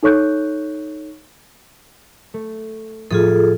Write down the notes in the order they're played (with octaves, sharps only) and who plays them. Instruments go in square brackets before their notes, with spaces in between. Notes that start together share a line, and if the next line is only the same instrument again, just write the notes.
[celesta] D#4 A4 C#5 C#6 F#6 G6
[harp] A3
[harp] A2 F3 D#6 [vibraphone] F4 G#4 A4